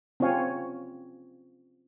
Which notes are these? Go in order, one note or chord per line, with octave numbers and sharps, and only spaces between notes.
C4 C#4 F4 C#5 F5 G#5